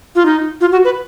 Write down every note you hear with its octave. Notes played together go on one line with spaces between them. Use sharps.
F4
D#4
F4
F#4
B4